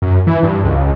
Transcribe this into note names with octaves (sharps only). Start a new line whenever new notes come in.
F#2
E3
G2
C#2